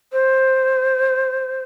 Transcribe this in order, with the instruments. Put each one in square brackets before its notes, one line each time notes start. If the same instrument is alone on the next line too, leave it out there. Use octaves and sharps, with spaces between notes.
[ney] C5